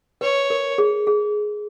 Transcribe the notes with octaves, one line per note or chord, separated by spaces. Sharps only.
B4 C#5
A#4
G#4
G#4